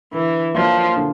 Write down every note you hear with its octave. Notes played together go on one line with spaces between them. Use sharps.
D3 E3
F3 F#3 A#3 D4 F4
D3